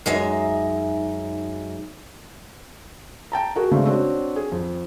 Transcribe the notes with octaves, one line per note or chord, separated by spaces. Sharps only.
F#2 G#3 D#4 E5
G5 A5 A#5
F#4 G#4 A#4
C#3 G#3 A3 C4 D4
C4 D4 F#4 C#5
G#4
F2